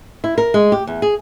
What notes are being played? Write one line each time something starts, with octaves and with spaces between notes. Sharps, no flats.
E4
A#4
G#3
G4
E2
G#4